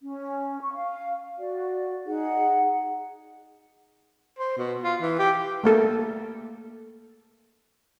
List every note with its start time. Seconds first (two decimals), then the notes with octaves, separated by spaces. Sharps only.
0.02 C#4
0.61 C#6
0.75 F5
1.37 F#4 D5
2.06 D#4 G#4 F#5
4.39 C5
4.58 B2
4.84 F4
5.02 E3
5.19 G4
5.64 A3 A#3 A4